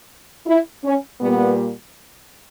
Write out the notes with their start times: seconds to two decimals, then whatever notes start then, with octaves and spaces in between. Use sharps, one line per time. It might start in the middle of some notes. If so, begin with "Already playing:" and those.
0.47 E4
0.84 C#4
1.21 A#2 G3 A#3 B3